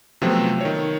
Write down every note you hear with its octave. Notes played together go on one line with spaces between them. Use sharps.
C3 F3 F#3 A3 B3 C4
D#3 C#5